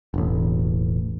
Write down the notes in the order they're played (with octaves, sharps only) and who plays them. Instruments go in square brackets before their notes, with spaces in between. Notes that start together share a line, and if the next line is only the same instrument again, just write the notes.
[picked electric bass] E1 A1